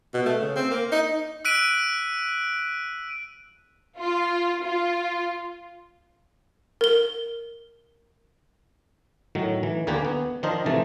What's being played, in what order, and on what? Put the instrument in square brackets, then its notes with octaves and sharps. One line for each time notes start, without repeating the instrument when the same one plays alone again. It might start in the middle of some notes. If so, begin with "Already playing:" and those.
[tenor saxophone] B2
A3
C#3
C4
A#3
D#4
[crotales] E6 F#6 B6 D7 D#7
[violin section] F4
F4
[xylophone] A#4 G7
[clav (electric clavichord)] A2 D#3 F#3
E3
D#2 D3 A#3 G4 B4 G#5
B3
D#3 F3 D4 A#4 C5 D#5
C3 E3 F3 A3 A5